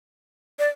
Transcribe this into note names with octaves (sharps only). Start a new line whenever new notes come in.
D5